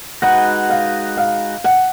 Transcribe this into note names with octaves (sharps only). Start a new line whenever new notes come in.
G#3 D#4 F#4 B4 F#5
F5
F5
F#5